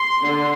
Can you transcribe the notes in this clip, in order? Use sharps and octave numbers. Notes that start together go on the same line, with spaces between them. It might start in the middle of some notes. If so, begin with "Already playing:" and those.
Already playing: C6
D3